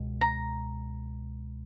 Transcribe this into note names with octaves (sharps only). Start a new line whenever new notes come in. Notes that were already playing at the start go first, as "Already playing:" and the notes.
Already playing: C#2 B2 G#3
A#5